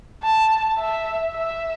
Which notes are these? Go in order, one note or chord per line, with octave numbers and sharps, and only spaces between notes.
A5
E5
E5